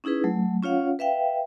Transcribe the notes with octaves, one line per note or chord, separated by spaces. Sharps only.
C#4 D#4 E4 G#4 B4
F#3 A3
C#4 F4 C#5 F5 F#5
B4 E5 F5 G5